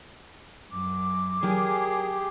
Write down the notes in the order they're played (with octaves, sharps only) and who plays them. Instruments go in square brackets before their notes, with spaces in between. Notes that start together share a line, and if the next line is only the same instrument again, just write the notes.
[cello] F#2 [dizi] D6
[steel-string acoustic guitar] F#3 A#4 G#5 [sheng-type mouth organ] G4 [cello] G#4